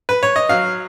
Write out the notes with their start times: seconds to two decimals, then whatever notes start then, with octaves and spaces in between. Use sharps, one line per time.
0.09 B4
0.23 C#5
0.36 D#5
0.49 F#3 F5